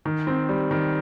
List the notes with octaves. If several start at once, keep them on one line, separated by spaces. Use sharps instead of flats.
D#3
C4
G3
D#3